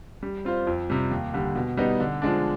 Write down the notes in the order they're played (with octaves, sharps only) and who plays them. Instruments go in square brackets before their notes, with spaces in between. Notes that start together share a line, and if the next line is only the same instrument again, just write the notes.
[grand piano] G3
C4 F4 C5
F2
C3 G3
D#2
D3 G3
B2
G3 B3 D#4
D3
F3 G#3 D4